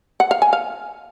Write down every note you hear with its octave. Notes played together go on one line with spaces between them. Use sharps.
F#5
F5
G#5
F5